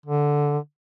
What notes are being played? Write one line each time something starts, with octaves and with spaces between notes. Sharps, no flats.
D3